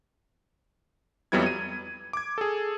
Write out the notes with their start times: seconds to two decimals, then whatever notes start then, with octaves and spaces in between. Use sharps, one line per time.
1.32 F2 F#3 G3 B3 E4 G#6
1.46 D#7
2.13 D6 G#6
2.38 G#4 A4